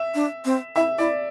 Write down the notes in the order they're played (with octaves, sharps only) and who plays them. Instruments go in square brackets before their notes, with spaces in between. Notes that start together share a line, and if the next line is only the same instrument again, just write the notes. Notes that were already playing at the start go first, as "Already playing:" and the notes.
Already playing: [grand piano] E5
[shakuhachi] D4
C4
[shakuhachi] E4 [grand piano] E5
[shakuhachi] E4 [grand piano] D5